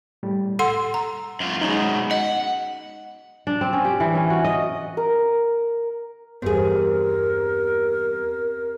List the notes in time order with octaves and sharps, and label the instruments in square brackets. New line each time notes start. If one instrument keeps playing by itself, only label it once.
[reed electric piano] A2 G3
[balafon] A4 F#5 C6 [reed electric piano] E6
[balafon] A#5
[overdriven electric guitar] F#2 F4
[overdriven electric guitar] F#2 B2 [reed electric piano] G#3 C#4 D#4
[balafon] D#5 [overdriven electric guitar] F#5
[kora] D4
C4
C#4
G4
E3
C#4
F#4
D#5
[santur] A#4
[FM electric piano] E2 G2 B3 [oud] C3 G#4 [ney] A#4